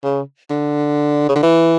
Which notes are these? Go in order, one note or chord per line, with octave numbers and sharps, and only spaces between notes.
C#3
D3
C#3
D3
E3